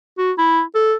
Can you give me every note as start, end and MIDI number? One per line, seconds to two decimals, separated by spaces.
0.18 0.32 66
0.38 0.61 64
0.75 0.94 69